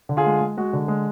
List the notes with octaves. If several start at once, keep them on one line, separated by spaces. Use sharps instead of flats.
D3
F4 G#4
G#3
G#3
G#3 F#4
D3
G#3